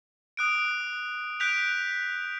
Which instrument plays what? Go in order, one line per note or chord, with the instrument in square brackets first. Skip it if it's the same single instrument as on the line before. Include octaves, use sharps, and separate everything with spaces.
[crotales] D#6 F#6 D7
F#6 G6 B6 D7 F7